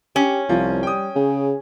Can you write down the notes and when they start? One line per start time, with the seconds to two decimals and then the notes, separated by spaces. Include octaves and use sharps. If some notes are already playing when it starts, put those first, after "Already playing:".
0.16 C#4 G4
0.49 C2 F3 F4
0.83 G3 G5 D#6
1.16 C#3 G#4